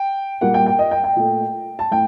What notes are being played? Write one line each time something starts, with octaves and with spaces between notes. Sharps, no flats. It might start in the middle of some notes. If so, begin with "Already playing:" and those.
Already playing: G5
A#2 G3 A#3 F#5
G5
G5
D#5
G5
G5
A#2 A3
A5
A2 G5